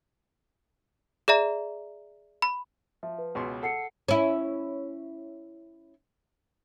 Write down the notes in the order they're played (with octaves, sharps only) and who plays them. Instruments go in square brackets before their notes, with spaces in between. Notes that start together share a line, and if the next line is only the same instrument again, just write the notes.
[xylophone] G#4 D5 E5 A#5
B5
[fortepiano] F3 [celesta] E5
[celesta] B4
[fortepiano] C#2 B2 C6
[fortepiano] A4 [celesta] F#5 C7 C#7
[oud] C#4 E4